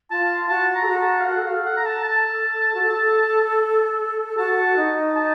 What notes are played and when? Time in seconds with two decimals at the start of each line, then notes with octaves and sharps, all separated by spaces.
0.10 F4 A5
0.49 F#4 A5
0.75 A#5
0.82 A4
0.88 F#4
1.01 A5
1.20 F5
1.26 A#4 F#5
1.36 A4
1.45 F#4 F5
1.54 A4
1.65 F#5
1.77 A#5
1.86 A5
2.04 A5
2.74 F#4
2.82 A4
4.37 F#4 A5
4.76 D#4
5.15 A5